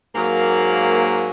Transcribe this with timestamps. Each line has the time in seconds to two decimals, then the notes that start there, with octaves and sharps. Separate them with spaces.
0.14 G#2 F#3 A#3